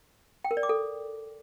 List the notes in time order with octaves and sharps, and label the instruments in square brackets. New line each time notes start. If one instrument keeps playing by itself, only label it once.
[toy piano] G5
A#4
D5
D6
A4